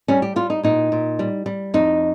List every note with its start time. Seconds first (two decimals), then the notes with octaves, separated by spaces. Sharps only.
0.08 G3 C#4
0.22 G4
0.36 G3 F4
0.50 D#4
0.63 A#2 D#4
0.92 A#2
1.19 G3
1.46 G3
1.74 F2 D#4